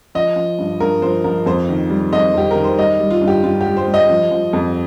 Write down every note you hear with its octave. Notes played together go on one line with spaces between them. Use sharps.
F3 D#5
F3
G2
G2 A#4
F3 C5
F3 A#4
F2 C5
D#3
G3
F2 D#5
F2 G4
D#3 A#4
C5
G3 D#5
G3
F4
G2
G4
G2 F4
G4
G3
C5
G3
D#5
F3
F3
F2